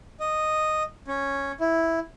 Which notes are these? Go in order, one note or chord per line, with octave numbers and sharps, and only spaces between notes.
D#5
C#4
E4